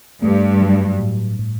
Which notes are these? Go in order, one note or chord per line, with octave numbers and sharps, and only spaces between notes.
G2 A3
F#3
A2
A2